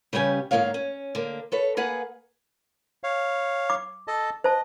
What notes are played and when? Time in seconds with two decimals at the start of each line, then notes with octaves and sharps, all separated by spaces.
0.13 C#3 G3 B3 C#4 G4 G#5
0.51 G#2 D3 D#3 A#3 C#5 F5
0.74 C#4
1.15 D3 A#3
1.52 A4 B4 C#5
1.77 A#3 G#4 B4 F#5
3.04 C#5 F5
3.70 D6
4.08 A4 D#5 A5
4.44 C5 D#5 A5